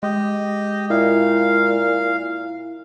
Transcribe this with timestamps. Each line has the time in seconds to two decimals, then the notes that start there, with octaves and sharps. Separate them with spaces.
0.03 G#3 G4 D#5
0.90 A#2 E4 F5